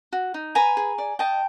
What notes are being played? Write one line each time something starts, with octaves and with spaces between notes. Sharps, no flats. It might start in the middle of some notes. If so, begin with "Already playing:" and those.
F#4
D#4
B4 G#5 A#5
G#4
D5
D#5 G5 A5